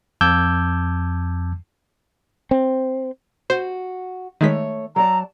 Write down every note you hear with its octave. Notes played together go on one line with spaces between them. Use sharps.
F2 A5 D6 E6 G6 G#6
C4
F#4 C5
D#3 G#3 A3 C#5 B6
F#3 D5 A5 A#5